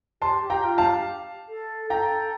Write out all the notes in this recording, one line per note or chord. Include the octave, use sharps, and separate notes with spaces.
G4 A5 C6
G4
G5 A#5
F4
F5 A5
G4
A4
A4 G5 A#5